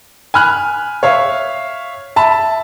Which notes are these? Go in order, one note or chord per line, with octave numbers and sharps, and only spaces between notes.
G#5 B5 F6 F#6
C#5 E5 F5
E5 A5 B5